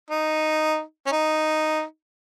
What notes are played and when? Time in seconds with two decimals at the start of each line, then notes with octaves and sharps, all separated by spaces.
0.10 D#4
1.06 C#4
1.12 D#4